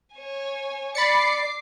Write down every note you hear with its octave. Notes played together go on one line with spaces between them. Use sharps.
C#5 G#5
D5 B5 D6 A6 C7 C#7